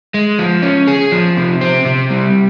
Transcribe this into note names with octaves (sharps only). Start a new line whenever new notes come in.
G#3
F3
C#4
G#4
F3
C3
C4
C3
G3